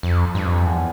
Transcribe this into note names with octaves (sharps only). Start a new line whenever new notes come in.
F2
G2
F2
E2